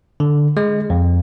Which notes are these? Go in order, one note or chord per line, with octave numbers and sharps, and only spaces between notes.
D3
G#3
F2